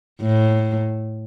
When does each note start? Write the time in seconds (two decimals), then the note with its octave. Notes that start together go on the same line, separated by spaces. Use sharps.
0.22 A2